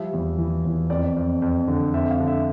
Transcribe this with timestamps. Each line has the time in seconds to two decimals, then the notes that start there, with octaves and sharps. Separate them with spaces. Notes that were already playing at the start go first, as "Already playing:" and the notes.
Already playing: F3 G3 E5
0.13 E2
0.38 E3
0.65 E2
0.90 F2 D5
1.17 F2
1.42 F2
1.68 D3
1.94 F2 E5
2.11 F5
2.20 D3
2.27 E5